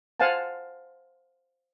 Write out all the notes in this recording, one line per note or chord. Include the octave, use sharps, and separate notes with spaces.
C5 F5 F#5 G#5 A5